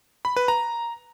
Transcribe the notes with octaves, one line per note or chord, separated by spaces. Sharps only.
B5
B4
A#5